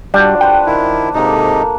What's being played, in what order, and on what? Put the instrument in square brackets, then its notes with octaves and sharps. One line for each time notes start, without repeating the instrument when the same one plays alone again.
[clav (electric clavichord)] G3 [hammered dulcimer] D4 F4 F#4
[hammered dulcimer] G4 B4 C5 [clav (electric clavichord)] G5
[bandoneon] D#3 E4
[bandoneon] G#2 C3 D#4 [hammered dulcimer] A#3 A4